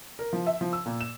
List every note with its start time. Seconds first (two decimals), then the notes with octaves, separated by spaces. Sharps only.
0.19 A#4
0.33 F3
0.47 E5
0.61 F3
0.73 E6
0.86 A#2
1.01 E7